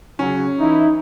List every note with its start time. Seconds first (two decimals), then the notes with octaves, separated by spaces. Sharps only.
0.19 C#3 F#3 C#4
0.60 E3 D#4 E4